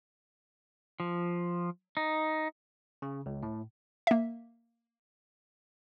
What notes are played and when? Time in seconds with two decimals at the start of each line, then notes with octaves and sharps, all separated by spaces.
1.00 F3
1.97 D#4
3.02 C#3
3.26 C#2
3.43 A2
4.07 A#3 E5